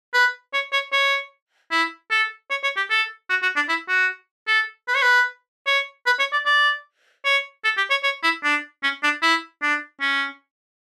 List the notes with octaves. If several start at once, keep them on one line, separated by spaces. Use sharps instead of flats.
B4
C#5
C#5
C#5
E4
A4
C#5
C#5
G4
A4
F#4
F#4
D4
E4
F#4
A4
B4
C#5
B4
C#5
B4
C#5
D5
D5
C#5
A4
G4
C#5
C#5
E4
D4
C#4
D4
E4
D4
C#4